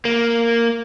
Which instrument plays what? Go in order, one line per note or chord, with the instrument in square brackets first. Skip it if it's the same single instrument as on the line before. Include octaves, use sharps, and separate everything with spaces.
[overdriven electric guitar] A#3